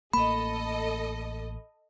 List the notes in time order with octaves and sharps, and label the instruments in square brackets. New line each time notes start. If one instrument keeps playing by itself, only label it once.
[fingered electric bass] A1 A#3 [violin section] A4 D#5 [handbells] B5